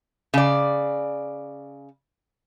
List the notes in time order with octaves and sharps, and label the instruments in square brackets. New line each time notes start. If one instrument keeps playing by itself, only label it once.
[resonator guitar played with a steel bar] C#3 D5